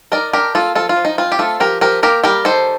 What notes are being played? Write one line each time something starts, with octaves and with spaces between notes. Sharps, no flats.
D#4 A#4 D5
D4 G4 A#4
A#3 F4 A4
F3 F4 A4
F4
F3
D#4
C4 F4
G4
A3 F4 A4
F3 G4 A#4
F3 G4 A#4
A#3 G4 A#4
G3 G4 A#4
D#3 A4 C5